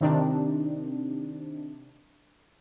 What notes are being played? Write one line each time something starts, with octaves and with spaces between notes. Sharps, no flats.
C3 D#3 C4 D4 D#4